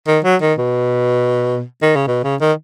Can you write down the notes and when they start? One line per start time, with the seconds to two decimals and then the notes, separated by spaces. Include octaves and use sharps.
0.07 D#3
0.24 F#3
0.42 D#3
0.58 B2
1.82 D#3
1.96 C#3
2.07 B2
2.24 C#3
2.41 D#3